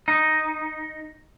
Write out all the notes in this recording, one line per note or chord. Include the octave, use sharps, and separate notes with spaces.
D#4